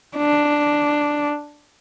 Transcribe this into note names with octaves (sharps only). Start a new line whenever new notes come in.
D4